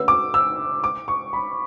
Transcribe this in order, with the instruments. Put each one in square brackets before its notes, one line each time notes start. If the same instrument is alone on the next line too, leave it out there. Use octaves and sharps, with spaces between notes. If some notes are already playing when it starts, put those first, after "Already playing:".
Already playing: [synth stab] D3 A3 C#4 F#4 B4 [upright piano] E6
[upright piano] D6
E6
D6
C#6
B5